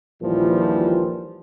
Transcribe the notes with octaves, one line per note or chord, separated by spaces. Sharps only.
A#1 D#2 A#2 E3 F3 G3